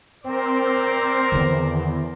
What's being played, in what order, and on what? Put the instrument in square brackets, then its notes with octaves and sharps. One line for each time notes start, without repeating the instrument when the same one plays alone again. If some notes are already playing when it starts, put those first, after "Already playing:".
[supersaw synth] C4 [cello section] A#4 C5 D5
[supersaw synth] E2 [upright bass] D3 D#3